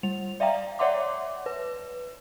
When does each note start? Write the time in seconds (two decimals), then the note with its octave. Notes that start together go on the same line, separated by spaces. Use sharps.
0.03 G3 F7
0.40 D5 E5 F5 G5 A#5
0.79 C#5 D5 E5 F#5 C6 D6
1.46 B4